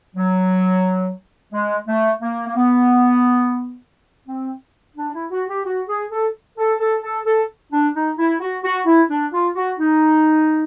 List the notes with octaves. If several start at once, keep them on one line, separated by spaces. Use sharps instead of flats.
F#3
G#3
A3
A#3
A#3
B3
C4
D4
E4
F#4
G4
F#4
G#4
A4
A4
A4
A4
A4
D4
D#4
E4
F#4
F#4
E4
D4
F4
F#4
D#4